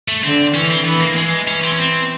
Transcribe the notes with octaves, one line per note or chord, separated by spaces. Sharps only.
A3
D3 C4
E3 C#4
C4
E3 B3
A#3
E3 G#3
C#4
C4
C#4
C4